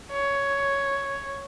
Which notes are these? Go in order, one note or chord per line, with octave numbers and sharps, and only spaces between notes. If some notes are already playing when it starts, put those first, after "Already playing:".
C#5